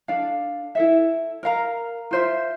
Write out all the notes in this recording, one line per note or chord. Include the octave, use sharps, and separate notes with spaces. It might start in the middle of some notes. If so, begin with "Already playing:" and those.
D4 A4 D5 F5
E4 A4 E5
A#4 F5 A#5
F4 C5 E5